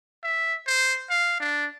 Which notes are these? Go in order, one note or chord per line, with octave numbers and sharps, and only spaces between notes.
E5
C5
F5
D4